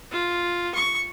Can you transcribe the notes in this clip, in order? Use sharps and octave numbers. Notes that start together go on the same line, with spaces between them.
F4
C#6